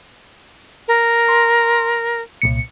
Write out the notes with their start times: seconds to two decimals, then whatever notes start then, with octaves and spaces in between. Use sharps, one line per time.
0.88 A#4
1.29 C6
2.42 C2 A#2 C#7